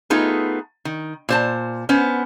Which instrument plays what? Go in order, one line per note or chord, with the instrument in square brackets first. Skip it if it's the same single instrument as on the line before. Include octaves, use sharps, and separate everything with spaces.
[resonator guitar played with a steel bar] A3 B3 D#4 F4 G#4 A4
D#3
A#2 C5 A5
B3 C#4 C5